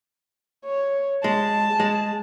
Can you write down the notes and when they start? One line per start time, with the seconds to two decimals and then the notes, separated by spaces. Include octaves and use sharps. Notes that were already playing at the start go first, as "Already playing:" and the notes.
0.66 C#5
1.24 G#3 A5
1.80 G#3